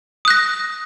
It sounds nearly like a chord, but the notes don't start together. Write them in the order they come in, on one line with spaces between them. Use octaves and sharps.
D#6 F#6 A#6